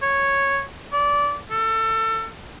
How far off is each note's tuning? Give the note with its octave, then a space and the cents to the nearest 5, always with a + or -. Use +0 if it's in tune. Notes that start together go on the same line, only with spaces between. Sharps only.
C#5 -5
D5 -20
A4 +25